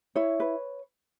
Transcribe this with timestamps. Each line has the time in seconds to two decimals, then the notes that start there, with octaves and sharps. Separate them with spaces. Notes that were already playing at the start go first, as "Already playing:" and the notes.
0.16 E4 C#5
0.40 B4